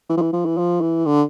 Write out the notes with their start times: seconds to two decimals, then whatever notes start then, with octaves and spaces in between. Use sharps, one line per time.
0.09 E3
0.17 F3
0.22 E3
0.33 F3
0.45 E3
0.58 F3
0.81 E3
1.06 D3